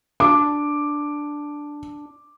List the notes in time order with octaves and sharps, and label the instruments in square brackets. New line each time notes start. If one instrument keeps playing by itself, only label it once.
[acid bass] D4 [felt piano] D6